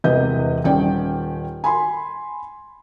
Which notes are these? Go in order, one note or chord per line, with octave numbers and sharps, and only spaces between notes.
E1 E2 C3 B4 D#5 G6
D#1 C#4 D5 G5
G#5 B5 C6